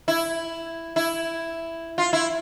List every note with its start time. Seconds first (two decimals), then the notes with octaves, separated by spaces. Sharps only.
0.08 E4
0.96 E4
1.98 F4
2.13 E4